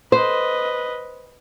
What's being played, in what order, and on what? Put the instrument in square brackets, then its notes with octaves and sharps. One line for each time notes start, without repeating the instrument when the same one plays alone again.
[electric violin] B4 D#5 [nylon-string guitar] C5